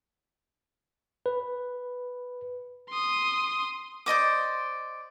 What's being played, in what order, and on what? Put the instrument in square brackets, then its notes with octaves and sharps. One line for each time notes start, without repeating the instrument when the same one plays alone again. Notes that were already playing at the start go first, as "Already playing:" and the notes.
[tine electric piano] B4
[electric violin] C6 D#6
[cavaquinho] C5 D5 D#5 D6